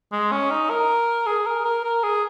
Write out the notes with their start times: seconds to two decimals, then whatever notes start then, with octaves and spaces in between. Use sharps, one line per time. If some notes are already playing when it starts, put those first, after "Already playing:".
0.12 G#3
0.31 C#4
0.51 D#4
0.70 A#4
1.26 G#4
1.46 A#4
1.65 A#4
1.84 A#4
2.03 G#4